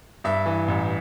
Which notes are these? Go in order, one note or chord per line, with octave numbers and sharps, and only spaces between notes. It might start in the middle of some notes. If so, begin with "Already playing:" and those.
G2 E5
E3
A1